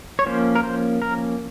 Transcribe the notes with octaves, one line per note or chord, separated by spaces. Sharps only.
C#5
F3 A#3 C#4 C5
A#4
C5
A#4